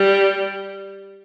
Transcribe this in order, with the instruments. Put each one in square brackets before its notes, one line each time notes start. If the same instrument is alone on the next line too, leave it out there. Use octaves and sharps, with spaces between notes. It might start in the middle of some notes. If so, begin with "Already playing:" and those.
Already playing: [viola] G3